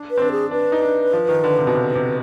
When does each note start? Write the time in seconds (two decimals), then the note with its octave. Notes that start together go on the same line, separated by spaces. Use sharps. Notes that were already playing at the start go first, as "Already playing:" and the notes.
Already playing: D4
0.11 B4
0.18 C4
0.21 D4
0.31 G#4
0.51 D4 B4
0.72 D#4
0.82 D4
1.13 F3
1.29 D#3
1.44 D3
1.59 C3
1.67 B2
1.75 C3
1.95 C3